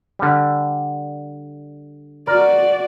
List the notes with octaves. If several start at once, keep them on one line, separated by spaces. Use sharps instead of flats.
D3 G3
F#4 A#4 D5